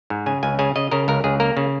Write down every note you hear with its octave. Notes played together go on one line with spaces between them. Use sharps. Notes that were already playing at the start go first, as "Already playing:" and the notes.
G#2
C#3 G#5
C#2 G#5
C#3 G#5
C#3 D#5
C#3 A#4
C#2 A#4
C#2 G#4
A#3 A#4
C#3